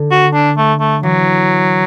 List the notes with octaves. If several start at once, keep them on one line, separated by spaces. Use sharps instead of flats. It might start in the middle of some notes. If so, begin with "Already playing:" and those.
Already playing: D3
F#4
D4
A3
A3
E3 F#3